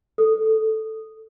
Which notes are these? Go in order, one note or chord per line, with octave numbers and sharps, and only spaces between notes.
A4